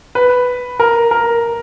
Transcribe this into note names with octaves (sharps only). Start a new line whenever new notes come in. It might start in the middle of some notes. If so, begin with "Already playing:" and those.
B4
A#4
A#4